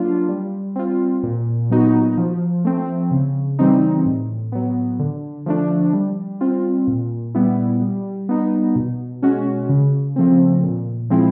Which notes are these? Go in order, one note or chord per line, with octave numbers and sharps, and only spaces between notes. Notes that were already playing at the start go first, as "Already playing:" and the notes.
Already playing: F#3 A#3 D4 F4
G3
C4 F4
A#2
F#3 B3 D#4 F#4
F3
A3 C4
C#3
E3 G3 C4 D#4
A2
F#3 B3
D3
F3 A3 D4
G3
C4 F4
A#2
G3 B3 E4
G3
B3 D#4
B2
G#3 C#4 F#4
C#3
F3 A3 C4
A#2
F3 G#3 C4 E4